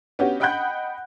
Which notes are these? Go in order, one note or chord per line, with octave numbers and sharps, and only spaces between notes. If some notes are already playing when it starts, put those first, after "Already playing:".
B3 C#4 F#4 G4
D#5 F#5 G5 B5 F#6 G6